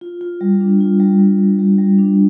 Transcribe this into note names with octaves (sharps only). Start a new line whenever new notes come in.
F4
F4
G3
D4
F4
G3
G3
G3
G3
G3
D4